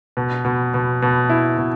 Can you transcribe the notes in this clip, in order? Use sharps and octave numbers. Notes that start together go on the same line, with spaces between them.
B2
B2
B2
B2
E4
B2